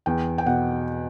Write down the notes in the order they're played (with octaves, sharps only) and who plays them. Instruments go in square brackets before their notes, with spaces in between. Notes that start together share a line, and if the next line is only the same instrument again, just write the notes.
[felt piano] E2 G5
G5
B2 F#5